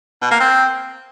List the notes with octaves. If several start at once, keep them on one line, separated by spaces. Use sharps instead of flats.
B2
A#3
C4